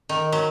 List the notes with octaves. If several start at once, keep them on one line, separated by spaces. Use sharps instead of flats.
D#3
F#3